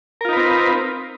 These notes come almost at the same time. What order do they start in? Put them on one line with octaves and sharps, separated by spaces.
A#4 F4 D#4 B4 C4